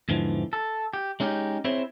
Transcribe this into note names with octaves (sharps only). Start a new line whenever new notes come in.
E2 G#2 D3 E3 F3
A4
G4
G#3 C#4 D#4 F#4 G4
C4 E4 G#4 C5 C#5